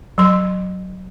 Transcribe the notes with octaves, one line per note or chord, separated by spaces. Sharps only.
F#3 C6